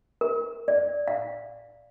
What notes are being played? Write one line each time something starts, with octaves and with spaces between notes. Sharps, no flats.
A#4
D5
F5